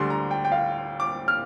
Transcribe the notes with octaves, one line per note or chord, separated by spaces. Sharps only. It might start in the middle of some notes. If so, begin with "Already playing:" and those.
Already playing: D2 D3 G3 C6
A#5
G5
G5
F5
D6
F6